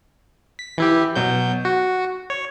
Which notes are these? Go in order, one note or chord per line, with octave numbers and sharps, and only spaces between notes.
B6
E3 E4 G4
B2 F#3 G6
F#4
C#5